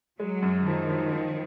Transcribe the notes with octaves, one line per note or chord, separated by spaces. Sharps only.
F#3 G#3
F#2
D#3 F3
F3
F3